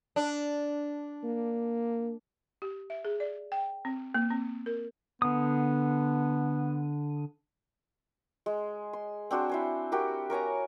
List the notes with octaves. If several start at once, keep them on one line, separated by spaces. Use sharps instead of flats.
D4
A#3
G4
E5
G#4
D5
G5
C4
A#3
C4
A#4
D3 B3 D#6
G#3
C6
C4 D4 F#4 C5
E4 C5 G#5
C4 F#4 G4 A#4
A#4 C#5 G#5 A#5